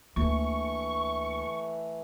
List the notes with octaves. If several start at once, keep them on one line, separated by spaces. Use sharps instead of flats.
D2 E3 A3 A#3 C#6